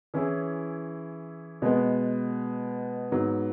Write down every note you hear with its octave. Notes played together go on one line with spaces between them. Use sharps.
E3 C#4 E4 G#4
B2 G#3 B3
G#2 F#3 B3 F#4